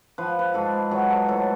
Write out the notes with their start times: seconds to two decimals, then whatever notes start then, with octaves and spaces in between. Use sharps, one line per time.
0.18 F3 B4
0.39 B4
0.54 G#2 A4
0.91 F#3 G#4
1.10 A4
1.29 A2 A4